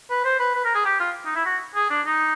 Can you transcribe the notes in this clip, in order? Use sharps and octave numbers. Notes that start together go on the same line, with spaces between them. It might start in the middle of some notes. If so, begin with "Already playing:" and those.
B4
C5
B4
B4
A#4
G#4
G4
F4
D#4
E4
F#4
G#4
D4
D#4